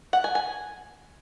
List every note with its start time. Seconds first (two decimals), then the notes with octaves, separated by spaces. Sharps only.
0.13 F#5
0.24 G#5
0.35 G#5